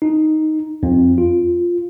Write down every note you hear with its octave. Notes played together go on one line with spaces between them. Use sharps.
D#4
F2
F4